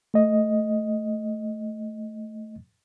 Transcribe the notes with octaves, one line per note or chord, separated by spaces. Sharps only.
A3 D#5